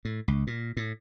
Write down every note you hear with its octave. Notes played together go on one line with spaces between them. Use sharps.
A2
C#2
A#2
A2